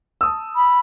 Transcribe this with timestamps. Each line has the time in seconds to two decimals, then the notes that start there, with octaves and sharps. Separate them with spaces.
0.21 A5 D#6 E6
0.56 B5